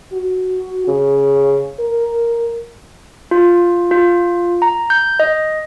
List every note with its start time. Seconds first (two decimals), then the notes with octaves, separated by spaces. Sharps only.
0.13 F#4
0.88 C#3
1.79 A#4
3.31 F4
3.91 F4
4.62 A#5
4.90 G6
5.20 D#5